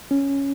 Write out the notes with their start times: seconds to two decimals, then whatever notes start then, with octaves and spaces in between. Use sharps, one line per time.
0.11 C#4